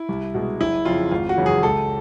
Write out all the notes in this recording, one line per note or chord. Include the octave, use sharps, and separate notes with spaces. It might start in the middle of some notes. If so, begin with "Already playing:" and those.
Already playing: E4
C2
B2 G#3
F#1 E4
F2 C#3 F4
G#1 F4
F#4
F#2 C#3 E3
G#4
C#2 A4